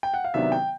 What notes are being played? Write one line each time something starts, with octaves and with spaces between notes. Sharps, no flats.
G5
F#5
F5
C3 D#3 F#3 B3 D4 E5
G5